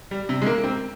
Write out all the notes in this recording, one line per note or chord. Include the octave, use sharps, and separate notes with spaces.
G3
C3
G#3
A#3
C4